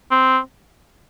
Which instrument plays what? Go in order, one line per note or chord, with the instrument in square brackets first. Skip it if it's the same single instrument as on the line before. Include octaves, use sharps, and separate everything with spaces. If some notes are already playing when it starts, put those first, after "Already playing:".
[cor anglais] C4